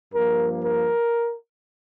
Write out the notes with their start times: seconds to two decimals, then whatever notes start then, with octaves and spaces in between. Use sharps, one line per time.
0.12 G2 F3 A#3 A#4
0.63 A#4